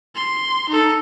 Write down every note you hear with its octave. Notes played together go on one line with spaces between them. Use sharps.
C6
D#4 A4